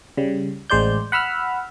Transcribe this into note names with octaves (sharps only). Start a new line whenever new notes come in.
C#3 G3
A1 G#3 C5 D5 G6
F#5 B5 E6 F6